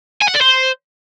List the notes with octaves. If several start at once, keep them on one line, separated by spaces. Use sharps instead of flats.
G#5
F#5
D5
C5